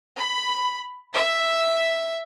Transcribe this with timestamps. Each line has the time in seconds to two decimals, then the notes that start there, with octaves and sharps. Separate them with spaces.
0.16 B5
1.14 E5